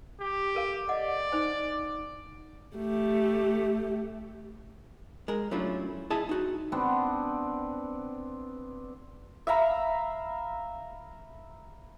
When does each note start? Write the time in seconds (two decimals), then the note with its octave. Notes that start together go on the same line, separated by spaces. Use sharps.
0.21 G4
0.55 A4 A#4 F5
0.89 D5 D#5 F#5
1.32 D#4 C5 G#5
2.77 A3 G4
5.28 G#3 A#4
5.51 F#3 A3 C#4 D4 E4 F4
6.10 E4 G#4 D#5 E5 G#5 A5
6.29 D#4 F#4
6.72 B3 C4 D4 F#5
9.47 E5 F5 A#5 B5